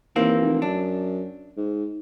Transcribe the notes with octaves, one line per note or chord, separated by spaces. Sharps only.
D#2 E3 A#3 C4
F1
F#2 D4
G#2